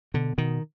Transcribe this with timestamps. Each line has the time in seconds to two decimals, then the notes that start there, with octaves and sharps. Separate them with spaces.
0.14 B2 D3
0.38 B2 D#3